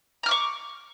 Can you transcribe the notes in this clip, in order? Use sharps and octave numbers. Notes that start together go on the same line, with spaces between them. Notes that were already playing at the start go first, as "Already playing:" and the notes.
A#5 C#6 D6 F6